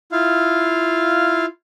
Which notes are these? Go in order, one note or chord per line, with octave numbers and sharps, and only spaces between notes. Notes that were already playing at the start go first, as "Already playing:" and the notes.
E4 F4 F5